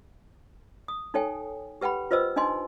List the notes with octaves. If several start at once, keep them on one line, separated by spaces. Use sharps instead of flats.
D#6
D#4 A4 C#5 G5 G#5
G4 B4 F#5 G5 B5
F4 B4 C5 D#5 E6
D4 D#4 D#5 G#5 C6